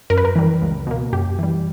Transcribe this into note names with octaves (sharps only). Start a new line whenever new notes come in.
F#2 A#4
B4
A#4
E3 G3
C#2
B2 A#3
F#2 G4
E3 G3